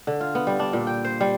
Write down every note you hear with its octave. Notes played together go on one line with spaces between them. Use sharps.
D3
F4
B3
G3
D4
A#2
G5
C5
G3